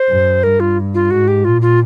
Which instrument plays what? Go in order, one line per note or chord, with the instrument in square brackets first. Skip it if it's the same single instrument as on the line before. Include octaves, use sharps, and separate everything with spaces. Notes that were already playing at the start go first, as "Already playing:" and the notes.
Already playing: [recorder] C5
[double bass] F#2
[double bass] G2 [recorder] A#4
[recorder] F4
F4
[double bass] G#2 [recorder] F#4
[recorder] G4
[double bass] A#2 [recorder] F4
[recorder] F4